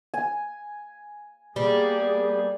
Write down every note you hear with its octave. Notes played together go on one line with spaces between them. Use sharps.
G#5
G3 A#3 B3 G#4